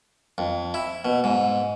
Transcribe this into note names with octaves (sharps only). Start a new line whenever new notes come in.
F2
E4
B2
G#2